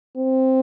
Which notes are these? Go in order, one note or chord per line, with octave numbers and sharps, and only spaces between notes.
C4